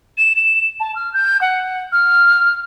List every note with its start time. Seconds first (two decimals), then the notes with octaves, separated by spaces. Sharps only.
0.18 E7
0.36 E7
0.80 A5
0.96 F6
1.14 G6
1.41 F#5
1.92 F6